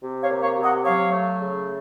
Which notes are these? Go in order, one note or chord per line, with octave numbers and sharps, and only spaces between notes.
C3
C#5 F5
A#3
C#5 F5
C3
D#5 F#5
F#3 C#5 F5
A3
C#3